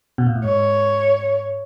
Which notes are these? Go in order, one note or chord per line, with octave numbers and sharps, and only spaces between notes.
B2
A#2
A2
G#2 C#5